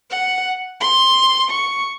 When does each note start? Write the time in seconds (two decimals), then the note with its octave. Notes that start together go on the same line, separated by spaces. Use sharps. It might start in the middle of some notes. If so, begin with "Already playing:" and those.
0.10 F#5
0.81 C6
1.51 C#6